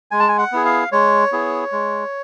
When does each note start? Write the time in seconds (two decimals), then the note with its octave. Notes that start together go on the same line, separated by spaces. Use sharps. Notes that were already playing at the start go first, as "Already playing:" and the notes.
0.11 G#3 G#5
0.20 A5
0.28 G#5
0.38 F#5
0.52 B3 E4 G#4
0.65 F5
0.92 G#3 C#5
1.32 B3 E4 G#4
1.72 G#3